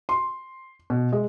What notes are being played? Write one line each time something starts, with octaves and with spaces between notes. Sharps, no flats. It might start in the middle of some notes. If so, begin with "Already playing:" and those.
C6
B2
G#3